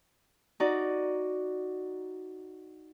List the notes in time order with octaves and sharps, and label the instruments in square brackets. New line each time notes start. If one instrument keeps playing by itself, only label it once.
[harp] D#4 F#4 D5